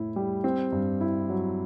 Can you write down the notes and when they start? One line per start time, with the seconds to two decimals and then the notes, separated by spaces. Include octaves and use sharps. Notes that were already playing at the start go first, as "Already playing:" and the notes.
Already playing: A2 E4
0.16 G3
0.44 C4
0.72 G2
1.01 E4
1.30 F#3